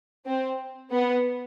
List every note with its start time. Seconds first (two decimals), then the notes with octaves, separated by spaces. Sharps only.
0.25 C4
0.91 B3